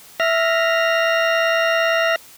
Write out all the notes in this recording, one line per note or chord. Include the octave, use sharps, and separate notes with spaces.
E5 F6 A#6